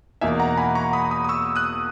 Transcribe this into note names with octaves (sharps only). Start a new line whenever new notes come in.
E2 B2 A#3 D#4 E5 G#5
F#5 A#5
G#5 B5
A#5 C#6
B5 D#6
B5 D#6
D#6
C#6 E6
D#6 F#6